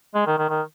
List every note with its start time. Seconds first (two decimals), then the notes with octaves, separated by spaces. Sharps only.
0.15 G#3
0.27 D#3
0.38 D#3
0.49 D#3